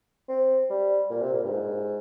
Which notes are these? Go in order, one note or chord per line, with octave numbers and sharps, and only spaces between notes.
C4
G3
A#2
C3
A#2
G2
G#2